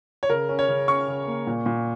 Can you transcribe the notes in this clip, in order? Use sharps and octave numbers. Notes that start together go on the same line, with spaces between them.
C#5
C#3 A#4
C#4
C#5
C#3
C#4 C#6
C#3
A#3
A#2
A#2